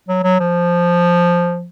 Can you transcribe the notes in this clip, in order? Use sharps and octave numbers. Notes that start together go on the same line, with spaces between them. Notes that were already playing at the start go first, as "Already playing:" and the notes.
F#3
F#3
F3